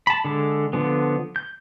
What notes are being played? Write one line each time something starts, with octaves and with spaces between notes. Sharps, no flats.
A5 B5
D3 G#3 A4
D3 F3 B3
G6